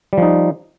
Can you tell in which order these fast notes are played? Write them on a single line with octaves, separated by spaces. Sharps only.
G3 F3 D#4